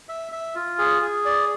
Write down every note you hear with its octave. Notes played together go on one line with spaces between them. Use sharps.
E5
E5
F4
G#4
G#4
D5